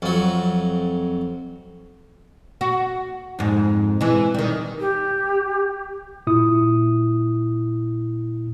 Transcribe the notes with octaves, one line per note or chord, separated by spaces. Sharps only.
F2 F#3
F#4
F2 G#2
E3 G#3
D#3 G3
G4
A#2 E4 D#6